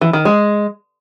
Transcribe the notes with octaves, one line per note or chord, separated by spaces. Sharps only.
E3
D#3
G#3